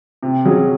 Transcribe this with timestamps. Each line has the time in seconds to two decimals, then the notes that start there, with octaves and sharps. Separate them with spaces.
0.23 C3
0.45 F#3 C#4 G#4